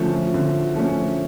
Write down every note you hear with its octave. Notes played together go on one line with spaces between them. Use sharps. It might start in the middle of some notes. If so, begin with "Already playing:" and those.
Already playing: D3 F3 A3 C#4
D3
F3 A3 C#4